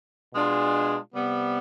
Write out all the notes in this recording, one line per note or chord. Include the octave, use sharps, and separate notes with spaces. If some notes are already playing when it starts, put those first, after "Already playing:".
B2 G#3 D4 F4 G#4
C3 G3 B3